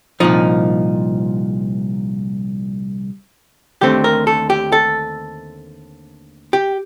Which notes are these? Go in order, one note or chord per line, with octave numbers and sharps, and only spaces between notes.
C2 A#2 F3 D#4
D#2 D3 A3 C4 G4
A#4
A4
G4
A4
G4